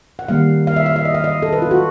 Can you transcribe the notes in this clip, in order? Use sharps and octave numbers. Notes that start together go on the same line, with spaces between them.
F#5
D#3 G3 A#3 F5
F5
E5
F5
E5
D#5
F5
D#5
A4
B4
F4
F#4